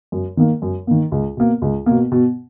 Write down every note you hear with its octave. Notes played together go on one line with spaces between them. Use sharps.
F#2
D#3 A#3
F#2
D#3 A#3
C#2
B2 A#3
C#2
B2 A#3
B2